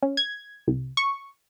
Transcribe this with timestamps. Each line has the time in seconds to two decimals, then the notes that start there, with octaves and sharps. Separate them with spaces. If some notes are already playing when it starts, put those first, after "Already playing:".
0.02 C#4
0.17 G#6
0.67 C2
0.97 C#6